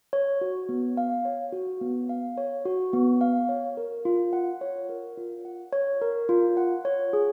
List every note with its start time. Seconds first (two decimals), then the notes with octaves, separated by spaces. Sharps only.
0.13 C#5
0.41 F#4
0.69 B3
0.97 F5
1.25 C#5
1.53 F#4
1.81 B3
2.09 F5
2.37 C#5
2.65 F#4
2.93 B3
3.21 F5
3.49 C#5
3.77 A#4
4.05 F4
4.33 F#5
4.61 C#5
4.89 A#4
5.17 F4
5.45 F#5
5.73 C#5
6.02 A#4
6.29 F4
6.57 F#5
6.85 C#5
7.13 G#4